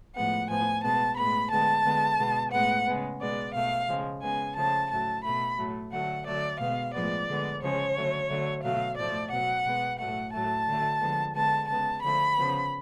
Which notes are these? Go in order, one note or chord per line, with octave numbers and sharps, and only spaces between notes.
A2 F3 G#3 B3 F#5
A2 F3 B3 G#5
B2 G#3 B3 A5
A2 G#3 B3 B5
D3 G#3 B3 A5
D3 G#3 B3
B2 G#3 B3
A2 G#3 B3 F#5
C#3 G#3 B3
B2 G#3 B3 D5
B2 A3 F5
C#3 F3 G#3
C#3 G#3 B3 G#5
C#3 F3 A3 A5
A2 F#3 A3 A5
B2 A3 B5
A2 F#3 A3
D3 F#3 A3 F#5
D3 F#3 A3 D5
B2 G#3 B3 F5
A2 F3 G#3 B3 D5
D3 G#3 B3
C#3 F3 G#3 C#5
D3 F#3 A3
D3 F#3 A3
B2 F#3 A3 F5
A2 F3 A3 D5
B2 F#3 B3 F#5
B2 G#3 B3
A2 F#3 A3 F#5
A2 F#3 A3 A5
D3 F#3 A3
D3 F3 G#3 B3
D3 G#3 B3 A5
C#3 G#3 B3 A5
D3 F3 A3 B5
C#3 F3 B3